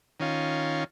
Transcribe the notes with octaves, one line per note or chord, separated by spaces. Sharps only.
D#3 C#4 F4